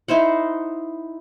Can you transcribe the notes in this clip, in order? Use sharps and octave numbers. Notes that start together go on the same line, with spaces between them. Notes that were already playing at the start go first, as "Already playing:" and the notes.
D#4 E4 C5 F#5